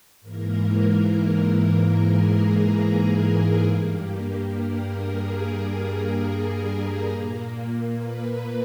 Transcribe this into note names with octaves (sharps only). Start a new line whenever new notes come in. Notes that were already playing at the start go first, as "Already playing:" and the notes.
G#2 E3 A#3 A#4
G#4
G2 G3 A#3
A#4
G#4
A#4
A#2 A#3
B4